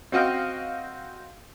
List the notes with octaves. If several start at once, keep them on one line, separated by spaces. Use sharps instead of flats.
C4 F#4 D#5 F5 G5